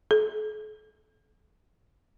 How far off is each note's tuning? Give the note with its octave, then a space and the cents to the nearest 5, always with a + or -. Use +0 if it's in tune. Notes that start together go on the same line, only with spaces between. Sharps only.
A4 -45